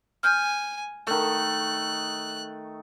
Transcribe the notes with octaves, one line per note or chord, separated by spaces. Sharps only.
G#5 F6 G6
D#3 A3 F#6